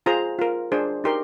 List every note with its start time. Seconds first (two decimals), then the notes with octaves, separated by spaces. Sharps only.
0.06 F4 G#4 C5 A#5
0.39 F4 A#4
0.72 D4 G#4 C5
1.04 D#4 G4 A#4 C6